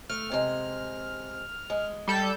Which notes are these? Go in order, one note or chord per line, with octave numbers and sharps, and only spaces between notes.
A3 F6
C3 G#3
G#3
G3 A4 G6